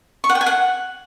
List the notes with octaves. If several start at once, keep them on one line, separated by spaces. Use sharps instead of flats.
C#6
F#5
G5
G#5
F#5